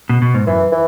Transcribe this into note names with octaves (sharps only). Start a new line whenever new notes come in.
B2
B2
G#2
F#2 E3
E3